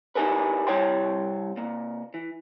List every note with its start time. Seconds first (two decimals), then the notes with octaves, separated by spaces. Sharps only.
0.15 D#4 E4 G4 G#4 A#4 B4
0.67 C2 G3 E4 C#5 G5 C6
1.57 C3 A#3
2.14 E3